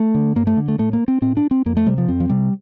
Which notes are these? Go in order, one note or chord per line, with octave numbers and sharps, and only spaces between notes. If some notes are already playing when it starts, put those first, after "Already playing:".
Already playing: A3
D3
G2 A#3
A3
D3
A3
A2 A3
A#3
C4
A2 C4
D4
C4
F2 A#3
A3
C3 G3
F3
F2 C4
F3
C3 G3